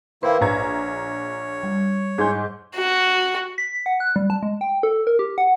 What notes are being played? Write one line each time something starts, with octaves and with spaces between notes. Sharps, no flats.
D#3 A#3 E4 B4 C5 F5
A#1 C#5 A#5 G#6
G3
G#2 G#5 C6 G6 G#6
F#4
B6
F#5
F#6
G3
A5
G#3
G5
A4
A#4
G4
F#5